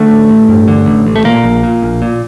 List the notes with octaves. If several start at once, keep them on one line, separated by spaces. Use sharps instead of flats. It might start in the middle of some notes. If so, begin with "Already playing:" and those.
Already playing: D3 A3
A1
A1
G2
D3
A1
A1
A3
A#2 A#3
A#1
A#2
A#1
A#2